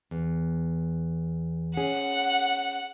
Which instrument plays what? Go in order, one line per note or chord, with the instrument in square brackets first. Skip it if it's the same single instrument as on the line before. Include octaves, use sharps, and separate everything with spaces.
[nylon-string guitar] E2
[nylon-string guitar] C#4 G#4 [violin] F#5